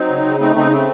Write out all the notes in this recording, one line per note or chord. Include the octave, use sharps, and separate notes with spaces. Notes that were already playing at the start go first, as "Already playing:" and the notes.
Already playing: F#3 C4 D#4
C#3
C#3
A3 C4 D#4
C#3 C4 D#4
A3 C4